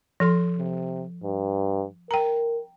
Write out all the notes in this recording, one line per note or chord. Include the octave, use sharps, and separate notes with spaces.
F3 A4 C6
C3
G2
A#4 G5 A#5